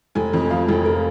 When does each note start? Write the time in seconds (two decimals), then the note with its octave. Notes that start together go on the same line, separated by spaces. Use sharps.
0.15 F1 G#5
0.33 F2
0.50 F3 F5
0.69 F1
0.86 A#4